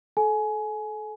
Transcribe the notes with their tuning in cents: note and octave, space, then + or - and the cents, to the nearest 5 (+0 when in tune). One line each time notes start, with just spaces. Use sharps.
A4 -30 G#5 +25